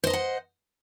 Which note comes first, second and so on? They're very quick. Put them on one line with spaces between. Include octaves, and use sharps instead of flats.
C5 D#5 A#5 F#5